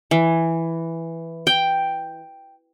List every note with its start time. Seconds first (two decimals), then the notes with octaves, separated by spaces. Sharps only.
0.11 E3
1.47 G5